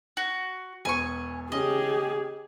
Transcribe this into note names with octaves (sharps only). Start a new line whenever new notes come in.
F#4
E1 B3 G#5 C#6
C#3 C#4 G4 G#4 D#5